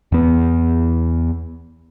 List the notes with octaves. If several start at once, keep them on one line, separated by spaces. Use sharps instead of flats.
E2 B3